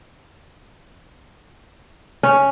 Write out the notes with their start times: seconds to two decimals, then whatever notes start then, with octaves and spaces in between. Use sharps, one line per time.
2.23 C#4